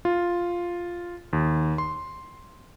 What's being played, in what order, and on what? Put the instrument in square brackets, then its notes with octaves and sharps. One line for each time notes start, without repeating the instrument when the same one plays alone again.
[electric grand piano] F4
D#2
C6